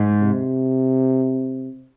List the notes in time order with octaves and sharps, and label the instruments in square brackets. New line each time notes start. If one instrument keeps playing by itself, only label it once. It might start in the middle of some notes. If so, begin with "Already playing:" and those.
Already playing: [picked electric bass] G#2
[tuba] C3